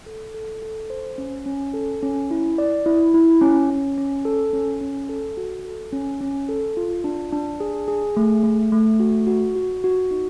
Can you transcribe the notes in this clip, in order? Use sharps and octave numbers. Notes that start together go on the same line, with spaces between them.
A4
A4
A4
C5
C#4
C#4
A4
C#4
E4
D5
E4
E4
C#4
C#4
C#4
A4
C#4
C#4
A4
F#4
A4
C#4
C#4
A4
F4
D4
D4
G#4
G#4
A3
A3
A3
F#4
F#4
F#4
F#4
D#4